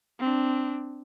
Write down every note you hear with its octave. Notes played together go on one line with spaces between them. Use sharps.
C4 D4